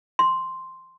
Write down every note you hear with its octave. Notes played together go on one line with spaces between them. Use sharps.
C6